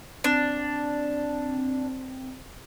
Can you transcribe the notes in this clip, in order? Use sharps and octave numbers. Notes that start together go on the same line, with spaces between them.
C4 D4